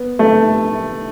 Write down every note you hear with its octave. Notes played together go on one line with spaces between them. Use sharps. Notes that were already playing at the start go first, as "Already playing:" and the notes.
Already playing: B3
A3